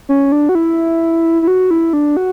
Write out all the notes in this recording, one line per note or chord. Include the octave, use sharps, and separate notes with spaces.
C#4
D4
F#4
E4
E4
F#4
E4
D4
F#4